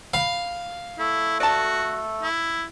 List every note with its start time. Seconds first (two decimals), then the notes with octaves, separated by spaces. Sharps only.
0.14 F5 B5
0.99 A3 E4 A4
1.40 F#4 D5 A5
2.23 E4